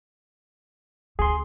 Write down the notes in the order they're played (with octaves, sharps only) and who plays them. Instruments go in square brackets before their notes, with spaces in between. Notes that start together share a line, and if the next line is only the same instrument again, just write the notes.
[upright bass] D2 C#3 [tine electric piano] G#4 C6